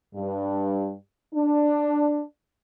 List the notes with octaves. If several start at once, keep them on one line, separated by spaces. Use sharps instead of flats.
G2
D4